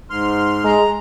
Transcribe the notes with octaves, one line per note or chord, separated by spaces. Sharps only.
G#2 C6 F6
G#3 A#5